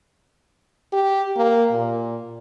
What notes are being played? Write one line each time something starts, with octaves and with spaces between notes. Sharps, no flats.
G4
A#3
A#2